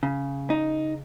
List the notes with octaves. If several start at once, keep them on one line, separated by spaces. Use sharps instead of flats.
C#3
D#4